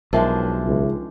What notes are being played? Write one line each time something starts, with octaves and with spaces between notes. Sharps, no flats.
B1 F3 G#3 D4 A#4 E5 G5
C#2